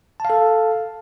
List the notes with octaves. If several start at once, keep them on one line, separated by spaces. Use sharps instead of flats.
A4 F5 A5